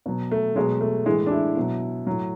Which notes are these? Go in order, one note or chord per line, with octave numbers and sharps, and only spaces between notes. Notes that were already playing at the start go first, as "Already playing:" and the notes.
B2 F#3
A3
B2 F#3 G#3
A3
A2 E3 G#3
D4
E4
B2 F#3
A2 F#3